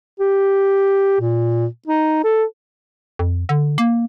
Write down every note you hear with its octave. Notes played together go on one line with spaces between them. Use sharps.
G4
A#2
D#4
A4
F2
D3
A#3